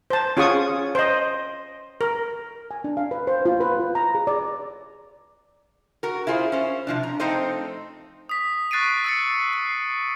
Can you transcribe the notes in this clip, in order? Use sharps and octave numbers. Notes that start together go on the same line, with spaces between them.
C5 A5
C#4 F4 G#4 F#5 C#6 D#6
C5 D#5
A#4
G#5
D4
F5
B4
C5
F4
B4
F4
A#5
G#4
D5
F#4 A#4
E4 F4 G#4 C5
C#4 C5
C3 F3 D4
A#5
F3 A3 C4 D#4 C5 D#5
D#6 B6
C#6 F#6 A6 C7 D7 D#7
E6 A6 C#7
C7